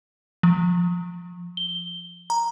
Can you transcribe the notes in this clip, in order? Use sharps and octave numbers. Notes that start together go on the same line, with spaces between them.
F3
G7
A#5